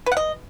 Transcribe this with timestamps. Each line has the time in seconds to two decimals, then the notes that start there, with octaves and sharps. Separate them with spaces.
0.06 B4
0.12 F#5
0.17 D#5